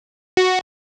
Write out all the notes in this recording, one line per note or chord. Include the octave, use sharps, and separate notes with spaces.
F#4